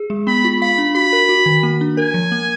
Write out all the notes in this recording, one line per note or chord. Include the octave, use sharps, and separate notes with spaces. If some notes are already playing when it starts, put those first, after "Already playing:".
Already playing: G#4
G#3
B3 B5
F4
F5 B5
D4
F#4 B5
A#4
F#4
D#3
A#3
D4
A#4 G#5
F3
A#3